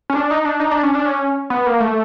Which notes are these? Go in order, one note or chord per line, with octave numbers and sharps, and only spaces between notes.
C#4
D4
D#4
D4
D#4
D4
C#4
D4
C#4
B3
A#3
A3